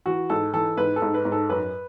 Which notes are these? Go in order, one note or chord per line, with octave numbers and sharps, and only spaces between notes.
E3 F#4
G#2 A4
E3 A4
G#2 B4
A4
G#2
B4
G#2
A4
F#2 B4